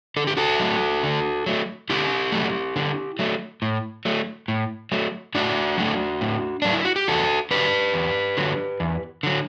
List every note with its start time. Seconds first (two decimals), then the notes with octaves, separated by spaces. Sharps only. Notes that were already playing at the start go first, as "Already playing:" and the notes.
0.16 D3 A4
0.27 G4
0.37 F#4 A4
0.60 F#3 A3
1.03 D3
1.46 F#3 A3
1.90 D3 E4 G4
2.32 F#3 A3
2.76 D3
3.19 F#3 A3
3.62 A2
4.05 F#3 A3
4.48 A2
4.92 F#3 A3
5.35 A2 D4 F#4
5.78 F#3 A3
6.21 A2
6.62 F#3 A3 D4
6.73 E4
6.85 F#4
6.96 G4
7.08 E2 F#4 A4
7.51 D3 F#3 G4 B4
7.94 E2
8.37 D3 F#3
8.80 E2
9.23 D3 F#3